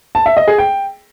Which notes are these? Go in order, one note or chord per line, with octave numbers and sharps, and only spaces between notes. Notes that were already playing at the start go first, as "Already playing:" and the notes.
A5
E5
D#5
G#4
G5